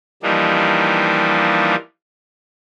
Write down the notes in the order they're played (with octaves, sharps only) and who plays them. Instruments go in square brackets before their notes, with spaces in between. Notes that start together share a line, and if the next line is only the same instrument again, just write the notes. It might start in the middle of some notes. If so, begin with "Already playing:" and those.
[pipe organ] E3 F3 G3 A#3 D4 D#4